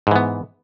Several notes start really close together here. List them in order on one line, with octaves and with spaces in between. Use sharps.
G#2 E3 B3